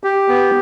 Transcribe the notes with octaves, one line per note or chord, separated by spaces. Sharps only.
G4
B3